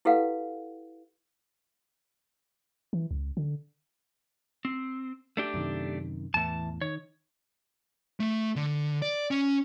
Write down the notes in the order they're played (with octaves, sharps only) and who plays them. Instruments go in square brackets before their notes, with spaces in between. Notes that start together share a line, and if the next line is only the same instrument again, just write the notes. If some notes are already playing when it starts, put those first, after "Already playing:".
[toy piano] E4 G4 A4 B4 F5 F#5
[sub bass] E3
C#2
D3
[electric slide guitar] C4
A3 D4 G4
[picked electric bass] F#2 C3 D#3
[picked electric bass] E2 A2 [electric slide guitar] E3 A5
[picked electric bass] D#3 [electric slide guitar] C#5
[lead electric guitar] A3
D3
D5
C#4